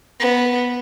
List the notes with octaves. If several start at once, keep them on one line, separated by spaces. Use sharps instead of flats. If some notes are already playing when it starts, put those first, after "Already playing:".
B3